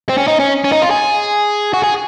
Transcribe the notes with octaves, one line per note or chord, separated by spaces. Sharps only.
C4
C#4
D#4
C#4
C#4
D#4
F4
G#4
F#4
G#4